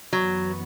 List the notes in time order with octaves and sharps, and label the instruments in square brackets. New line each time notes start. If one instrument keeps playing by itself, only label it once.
[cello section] F#2 E3 B3 [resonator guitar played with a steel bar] F#3